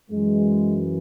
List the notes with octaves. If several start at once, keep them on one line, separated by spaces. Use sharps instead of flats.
F#2 E3 G#3